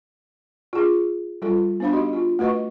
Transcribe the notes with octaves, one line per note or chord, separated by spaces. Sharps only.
F4 G#4
G3 F4 A4
B3 D4 C5 F5 B5
D#4 F#4 G4 D#5
F4
A3 F#4 B4 D#5 C#6